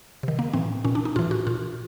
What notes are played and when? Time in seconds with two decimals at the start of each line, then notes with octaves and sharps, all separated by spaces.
0.23 C3 D#3
0.39 A#3
0.53 A2 E3 C4
0.85 A#2 C#4
0.95 D4
1.05 D#4
1.16 A2 E3 F4
1.31 F#4
1.47 A#2 F4